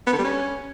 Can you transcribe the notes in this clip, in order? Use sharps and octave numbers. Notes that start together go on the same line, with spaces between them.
B3
D3
G3
C#4